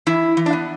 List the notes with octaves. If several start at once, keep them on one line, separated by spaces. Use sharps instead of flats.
E3 E4
E3
D4
B3